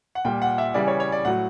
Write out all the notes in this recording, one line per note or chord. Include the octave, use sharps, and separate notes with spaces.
F#5
A#2 G3 G5
F#5
E5
C#3 E3 G3 D5
C#5
C#5
D5
A2 F#3 F#5